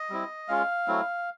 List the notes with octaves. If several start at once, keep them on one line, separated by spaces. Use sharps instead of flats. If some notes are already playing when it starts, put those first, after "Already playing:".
Already playing: D#5
G3 C4 E4
G#3 C#4 F4 F5
F#3 A3 C4 E4